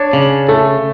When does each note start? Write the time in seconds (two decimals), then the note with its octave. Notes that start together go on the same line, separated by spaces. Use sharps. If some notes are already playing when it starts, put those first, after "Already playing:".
Already playing: D4 C#5
0.13 C#3
0.48 A3 A4